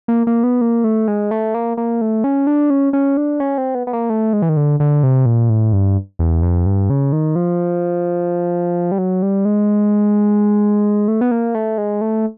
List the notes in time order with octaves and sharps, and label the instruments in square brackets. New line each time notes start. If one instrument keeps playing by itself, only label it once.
[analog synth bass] A#3
A#3
B3
A#3
A3
G#3
A3
A#3
A#3
A3
C#4
D4
C#4
C#4
D4
C#4
C4
B3
B3
A#3
A3
G#3
E3
D#3
D3
D3
C3
A#2
A2
G2
E2
F2
G2
C#3
D#3
F3
G3
F#3
G3
G#3
A3
B3
A#3
A3
G#3
A3